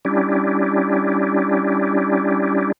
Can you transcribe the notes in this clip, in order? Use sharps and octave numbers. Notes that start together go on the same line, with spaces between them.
G3 C#4 D4 E4 G4